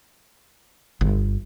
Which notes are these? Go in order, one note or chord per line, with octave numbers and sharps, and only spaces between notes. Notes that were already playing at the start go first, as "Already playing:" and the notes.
G1